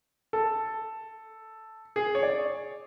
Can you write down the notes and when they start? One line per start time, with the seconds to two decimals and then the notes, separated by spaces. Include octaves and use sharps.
0.33 A4
1.96 G#4
2.15 C#5
2.23 D5